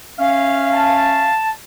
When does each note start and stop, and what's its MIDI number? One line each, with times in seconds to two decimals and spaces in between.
0.19 1.31 61
0.19 1.31 76
0.19 1.31 77
0.72 1.48 81